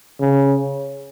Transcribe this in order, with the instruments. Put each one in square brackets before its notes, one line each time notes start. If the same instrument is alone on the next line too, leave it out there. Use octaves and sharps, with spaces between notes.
[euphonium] C#3